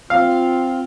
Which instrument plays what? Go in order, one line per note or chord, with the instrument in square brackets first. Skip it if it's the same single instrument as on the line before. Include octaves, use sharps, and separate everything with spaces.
[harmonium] C4 F4 [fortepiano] F5